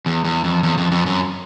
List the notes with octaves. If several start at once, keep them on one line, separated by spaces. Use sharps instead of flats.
E2
E2
F2
E2
F2
F2
F#2